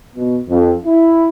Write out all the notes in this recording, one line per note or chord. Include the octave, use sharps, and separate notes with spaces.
B2
F2
E4